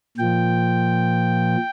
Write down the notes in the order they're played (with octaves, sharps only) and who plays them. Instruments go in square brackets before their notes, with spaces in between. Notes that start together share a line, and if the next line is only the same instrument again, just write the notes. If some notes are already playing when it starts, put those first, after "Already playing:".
[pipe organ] A#2 F3 G5